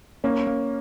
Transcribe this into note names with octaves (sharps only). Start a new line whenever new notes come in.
A#3 C#4
A#3